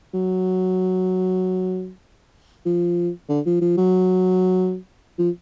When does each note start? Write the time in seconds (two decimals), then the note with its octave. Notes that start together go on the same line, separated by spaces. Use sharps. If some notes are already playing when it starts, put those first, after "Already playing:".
0.14 F#3
2.66 F3
3.29 D3
3.46 F3
3.61 F3
3.77 F#3
5.19 F3